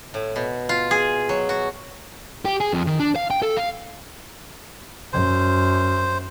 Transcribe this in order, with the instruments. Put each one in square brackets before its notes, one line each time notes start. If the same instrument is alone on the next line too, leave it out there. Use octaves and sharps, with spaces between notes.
[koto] A2
B2
F4
G#4
F#3
F#4
[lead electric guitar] G4
G#4
F2
D#3
D4
F5
G5
A4
F5
[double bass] F#2 [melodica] C5